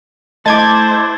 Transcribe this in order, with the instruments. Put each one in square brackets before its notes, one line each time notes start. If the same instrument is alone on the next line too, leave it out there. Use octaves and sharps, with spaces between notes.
[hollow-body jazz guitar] A3 D#5 [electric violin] E4 C5 [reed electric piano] A5 [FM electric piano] D6 G#6 A6